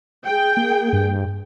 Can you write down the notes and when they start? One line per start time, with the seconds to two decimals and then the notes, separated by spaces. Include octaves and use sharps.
0.25 G#4 G5
0.57 A#3
0.93 G2